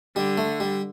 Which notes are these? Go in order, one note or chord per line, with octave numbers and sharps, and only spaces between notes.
D3 G3
A3
G3